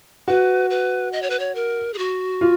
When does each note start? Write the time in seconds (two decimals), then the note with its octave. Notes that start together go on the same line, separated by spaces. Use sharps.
0.28 F#4 B4
0.70 B4
1.13 D#5
1.22 C#5
1.30 B4
1.39 C#5
1.55 A#4
1.94 G#4
1.98 F#4
2.41 F4